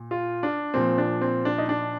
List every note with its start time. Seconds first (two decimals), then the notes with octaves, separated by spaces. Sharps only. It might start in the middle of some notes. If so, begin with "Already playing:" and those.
Already playing: A#2
0.11 F4
0.43 D4
0.74 A#2 F3 C4
0.98 D4
1.21 C4
1.45 D4
1.58 D#4
1.69 D4